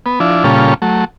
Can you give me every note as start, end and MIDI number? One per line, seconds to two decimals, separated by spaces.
0.06 0.19 59
0.20 0.43 53
0.20 0.43 62
0.20 0.43 64
0.44 0.74 46
0.44 0.74 49
0.44 0.74 55
0.44 0.74 61
0.44 0.74 65
0.44 0.74 69
0.82 1.05 54
0.82 1.05 57